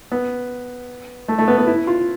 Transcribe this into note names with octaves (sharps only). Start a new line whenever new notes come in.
B3
A3
A3
B3
B3
E4
F4